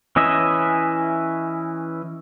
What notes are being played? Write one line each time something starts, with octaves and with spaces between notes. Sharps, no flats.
E3 C#4 E4 D#5 E5